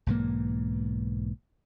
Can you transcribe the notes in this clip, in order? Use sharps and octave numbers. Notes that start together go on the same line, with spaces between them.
B1 G#2 E3 A#3